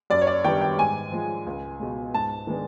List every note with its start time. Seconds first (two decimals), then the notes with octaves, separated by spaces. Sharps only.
0.10 F#2 D5
0.21 C#5
0.27 D5
0.44 D#3 G3 B3 D4 G5
0.61 G5
0.78 G#2 G#5
1.12 F3 G#3
1.47 C#2
1.80 B2 G#3
2.14 G#2 A5
2.47 D#3 G#3 B3 D4